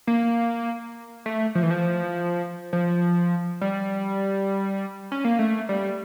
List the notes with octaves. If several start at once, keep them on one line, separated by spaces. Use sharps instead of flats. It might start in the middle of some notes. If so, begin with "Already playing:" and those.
A#3
A3
F3
E3
F3
F3
G3
C#4
A#3
A3
G3